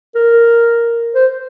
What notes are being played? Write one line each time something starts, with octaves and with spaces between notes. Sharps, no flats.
A#4
C5